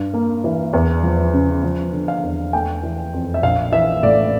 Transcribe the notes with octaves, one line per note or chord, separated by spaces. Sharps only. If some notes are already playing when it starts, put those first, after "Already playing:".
Already playing: G2
A#3
E3
E2
F3
C#3
F3
D3
F5
E2
A3 G5
E3
F2
E5
A#1 F5
E3 E5
A2 D5